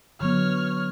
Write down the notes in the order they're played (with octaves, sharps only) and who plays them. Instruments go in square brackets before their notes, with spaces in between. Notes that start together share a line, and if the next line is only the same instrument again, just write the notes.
[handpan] D3 F#3 B3 [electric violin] C#5 F6